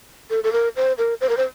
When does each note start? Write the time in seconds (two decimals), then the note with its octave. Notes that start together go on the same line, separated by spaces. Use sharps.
0.30 A4
0.44 A4
0.52 A#4
0.76 C5
0.98 A#4
1.21 C5
1.29 A#4
1.37 C5